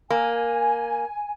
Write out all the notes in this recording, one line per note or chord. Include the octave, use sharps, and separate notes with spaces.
A#3 G#5